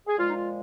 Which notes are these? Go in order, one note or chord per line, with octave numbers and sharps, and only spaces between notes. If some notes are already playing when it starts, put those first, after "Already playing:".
G#4
A#2 F3 G#3 F4
D#4
F4